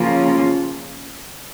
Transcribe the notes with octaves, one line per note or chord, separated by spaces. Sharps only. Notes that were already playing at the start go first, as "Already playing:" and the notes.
Already playing: C#3 F3 A#3 C#4 F4